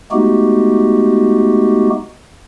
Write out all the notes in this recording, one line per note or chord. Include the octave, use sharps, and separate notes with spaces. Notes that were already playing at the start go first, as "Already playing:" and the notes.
G#3 A3 B3 D#4 F#4 G4